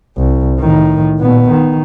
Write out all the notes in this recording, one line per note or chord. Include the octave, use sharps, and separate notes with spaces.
C2
A2 D#3
A#2 B3
D#3